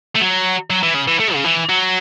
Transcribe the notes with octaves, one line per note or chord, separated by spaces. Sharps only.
A3
F#3
F#3
E3
C#3
E3
A3
C#3
E3
F#3